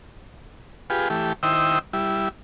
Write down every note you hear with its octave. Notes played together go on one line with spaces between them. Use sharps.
F4 G4 G#4 B4
E3 A3 G4
D#3 E4 C5 G5 D#6 E6
G3 E4